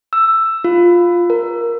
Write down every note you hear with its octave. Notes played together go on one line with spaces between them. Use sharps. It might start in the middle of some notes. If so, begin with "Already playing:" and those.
E6
F4
A#4